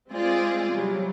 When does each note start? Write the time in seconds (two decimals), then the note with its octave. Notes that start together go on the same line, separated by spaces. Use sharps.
0.12 G#3 C4 F4 G#4 C5 D5
0.71 C3 F#3 G3